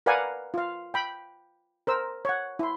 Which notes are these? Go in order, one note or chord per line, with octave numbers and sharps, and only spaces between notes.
A#4 B4 D5 F5 F#5 G#5
F4 F5
G5 B5
A#4 C5 E6
C#5 F#5
E4 C6